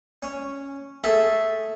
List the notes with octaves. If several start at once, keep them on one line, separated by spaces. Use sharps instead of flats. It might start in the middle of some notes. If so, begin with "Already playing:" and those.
C#4
A3 G#4 A4 E5